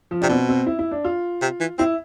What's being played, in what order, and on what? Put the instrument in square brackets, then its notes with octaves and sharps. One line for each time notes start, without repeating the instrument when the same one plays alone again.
[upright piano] F3
[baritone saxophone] C3 [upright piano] D4
[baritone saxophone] B2 [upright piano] C4
[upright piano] C4
E4
E4
D4
F4
[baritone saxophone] C3
E3
[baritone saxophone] C4 [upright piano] E4